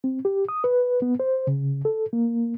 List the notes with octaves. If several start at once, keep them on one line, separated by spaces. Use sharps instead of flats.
C4
G4
D#6
B4
B3
C5
C#3
A4
A#3